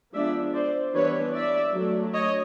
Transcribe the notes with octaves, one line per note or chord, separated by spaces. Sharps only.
F3 G#3 B3 D4 D5 E5
C5 D5
E3 G3 B3 D4 B4 C#5
D5 E5
F#3 A3 D4
C#5 D#5